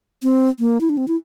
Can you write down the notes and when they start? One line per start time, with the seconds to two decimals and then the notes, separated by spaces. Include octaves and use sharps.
0.23 C4
0.60 A#3
0.81 E4
0.89 D4
0.97 C4
1.08 E4